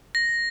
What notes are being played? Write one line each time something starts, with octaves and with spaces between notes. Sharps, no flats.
A#6